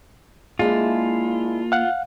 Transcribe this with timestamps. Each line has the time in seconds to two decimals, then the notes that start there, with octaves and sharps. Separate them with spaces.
0.59 G#3 A#3 D4 E4 F4
1.72 F5 F#5